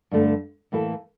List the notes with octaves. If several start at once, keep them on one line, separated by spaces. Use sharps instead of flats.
G2 D3 A3
A2 E3 A#3 E4 A4